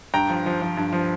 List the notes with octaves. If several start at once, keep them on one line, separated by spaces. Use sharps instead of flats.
G2 G5 A#5
F3
F3
F3
G2
F3